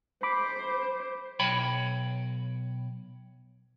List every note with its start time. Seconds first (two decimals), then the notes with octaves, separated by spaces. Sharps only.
0.23 C5 B5 D6
1.40 B1 C#5 G5 B5